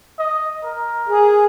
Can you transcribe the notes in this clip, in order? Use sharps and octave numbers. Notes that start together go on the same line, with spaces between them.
D#5
A#4
G#4